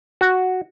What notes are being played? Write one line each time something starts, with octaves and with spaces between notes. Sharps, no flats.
F#4